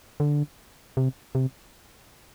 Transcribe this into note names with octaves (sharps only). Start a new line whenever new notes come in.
D3
C3
C3